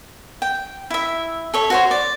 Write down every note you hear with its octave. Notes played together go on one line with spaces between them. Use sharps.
G5
E4 E5
A4 C#5 E5
F#4 C5 C#5
D5